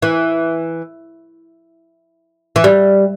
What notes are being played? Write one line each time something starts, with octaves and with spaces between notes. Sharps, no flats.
E3
E3
G3